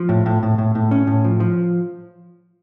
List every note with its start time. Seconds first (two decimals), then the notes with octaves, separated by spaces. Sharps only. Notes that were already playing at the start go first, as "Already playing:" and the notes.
Already playing: F3
0.09 A2
0.26 A2
0.43 A2
0.58 A2
0.75 A2
0.91 C#4
1.07 A2
1.24 F3
1.40 F3